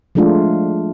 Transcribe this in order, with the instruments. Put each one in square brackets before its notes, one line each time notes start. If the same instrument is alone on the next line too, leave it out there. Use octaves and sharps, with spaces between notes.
[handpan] F3 G#3 A3 D4 F4